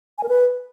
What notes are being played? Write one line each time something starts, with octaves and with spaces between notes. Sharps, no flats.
G#5
A#4
B4